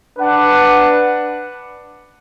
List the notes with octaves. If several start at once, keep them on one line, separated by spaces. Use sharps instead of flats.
D4 B4 F#5